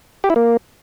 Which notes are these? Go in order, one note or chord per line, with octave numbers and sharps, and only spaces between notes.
G4
E4
A#3